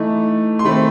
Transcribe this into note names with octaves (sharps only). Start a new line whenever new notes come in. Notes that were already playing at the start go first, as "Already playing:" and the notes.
Already playing: E3 A3 D#4
C6
D#3 A3 C4 B5